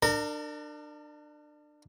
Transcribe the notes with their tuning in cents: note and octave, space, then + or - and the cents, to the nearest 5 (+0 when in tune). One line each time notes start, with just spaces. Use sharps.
D4 +30 A#4 -25